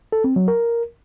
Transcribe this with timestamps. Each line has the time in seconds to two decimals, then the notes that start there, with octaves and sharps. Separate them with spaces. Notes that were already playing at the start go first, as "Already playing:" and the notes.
0.12 A4
0.24 C4
0.36 F#3
0.48 A#4